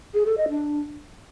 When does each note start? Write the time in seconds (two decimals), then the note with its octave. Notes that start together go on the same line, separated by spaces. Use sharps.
0.14 G#4
0.26 A4
0.38 D#5
0.49 D4